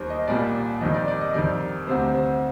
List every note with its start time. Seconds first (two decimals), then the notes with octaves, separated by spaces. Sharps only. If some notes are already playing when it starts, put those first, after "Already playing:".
Already playing: D#2 D#3 G3 A#4 C5
0.10 D#5
0.27 C2 A#2 G3 D5
0.81 F2 D#3 G3 D#5
0.94 D5
1.08 D5
1.21 D#5
1.34 F2 D#3 G3 D5
1.87 D2 C3 G3 C5
2.14 C5